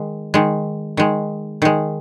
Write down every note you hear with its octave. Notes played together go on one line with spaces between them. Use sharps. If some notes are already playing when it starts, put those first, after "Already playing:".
Already playing: D#3 G#3
D#3 G#3
D#3 G#3
D#3 G#3